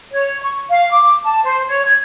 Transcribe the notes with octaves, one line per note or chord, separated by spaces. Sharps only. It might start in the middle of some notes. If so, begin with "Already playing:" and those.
C#5
C#6
F5
D6
A5
C5
C#5
G#6